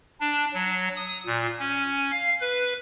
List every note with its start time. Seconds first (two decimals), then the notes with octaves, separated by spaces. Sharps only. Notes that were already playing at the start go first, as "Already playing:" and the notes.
0.21 D4
0.53 F#3
0.96 D#6
1.26 A#2
1.59 C#4
2.12 F5
2.41 B4